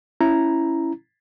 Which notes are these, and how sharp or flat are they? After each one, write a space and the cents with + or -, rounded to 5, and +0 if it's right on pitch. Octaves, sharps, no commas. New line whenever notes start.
C#4 +0 E4 +5 A#5 +0